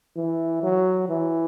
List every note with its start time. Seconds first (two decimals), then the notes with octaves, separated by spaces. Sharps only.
0.17 E3
0.64 F#3
1.09 E3